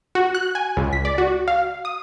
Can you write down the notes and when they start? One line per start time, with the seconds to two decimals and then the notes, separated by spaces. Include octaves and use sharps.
0.15 F#4
0.35 F#6
0.55 G#5
0.77 C#2
0.93 B6
1.05 D5
1.18 F#4
1.48 F5
1.85 D#6